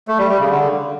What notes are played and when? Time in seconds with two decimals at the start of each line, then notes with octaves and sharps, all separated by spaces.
0.08 A3
0.19 G3
0.29 G3
0.39 C#3
0.50 D3